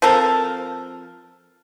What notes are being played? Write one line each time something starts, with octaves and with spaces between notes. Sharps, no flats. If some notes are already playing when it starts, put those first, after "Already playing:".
F3 C4 A4 A#4